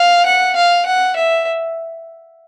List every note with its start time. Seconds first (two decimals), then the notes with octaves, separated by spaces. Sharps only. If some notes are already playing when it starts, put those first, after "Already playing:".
Already playing: F5
0.26 F#5
0.56 F5
0.86 F#5
1.16 E5